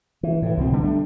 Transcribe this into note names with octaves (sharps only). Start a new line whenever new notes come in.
E3
A2 E3
C2 B2 D3 C4
D3 G3 B3
G3 A3 D4